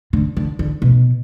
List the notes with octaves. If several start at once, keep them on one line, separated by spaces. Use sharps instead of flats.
D3
D3
D3
B2